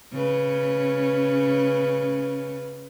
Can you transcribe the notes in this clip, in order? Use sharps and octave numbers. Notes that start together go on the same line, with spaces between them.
C#3 C#4 B4